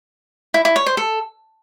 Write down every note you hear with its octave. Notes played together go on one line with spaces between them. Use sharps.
E4
E4
C#5
C5
A4